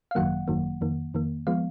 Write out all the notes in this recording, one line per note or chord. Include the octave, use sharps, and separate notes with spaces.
F5
G#1 F#2 D#3 F#3 A#3 F#5
G#1 F#2 D#3 F#3 A#3
F2 D#3 A#3
F2 D#3 A#3
F3 G#3 B3 F5